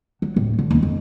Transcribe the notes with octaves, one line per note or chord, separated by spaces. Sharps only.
F#3
D#1 A2
D3
D#2 C#4
F2